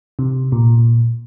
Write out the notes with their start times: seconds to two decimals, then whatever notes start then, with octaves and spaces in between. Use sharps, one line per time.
0.19 C3
0.52 A#2